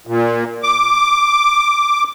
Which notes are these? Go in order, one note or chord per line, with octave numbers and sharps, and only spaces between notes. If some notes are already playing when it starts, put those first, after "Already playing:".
A#2
D6